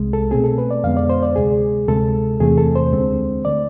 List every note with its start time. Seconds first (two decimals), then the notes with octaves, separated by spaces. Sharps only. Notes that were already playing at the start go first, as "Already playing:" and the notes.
Already playing: C2 C3 G#3
0.13 A4
0.31 B2 A3 C4 G#4
0.44 A4
0.58 B4
0.71 D5
0.84 F2 D3 G#3 B3 F5
0.97 D5
1.10 C5
1.23 D5
1.36 D2 C3 G#3 G#4
1.88 D2 C3 G#3 A4
2.40 E2 C3 E3 A3 C4 G#4
2.58 A4
2.76 C5
2.92 D2 D3 G#3 C4
3.45 D3 A3 D5